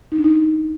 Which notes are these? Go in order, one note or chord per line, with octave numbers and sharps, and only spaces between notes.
D#4
D4
D#4